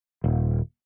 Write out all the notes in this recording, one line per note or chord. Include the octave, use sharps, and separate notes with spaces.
D#1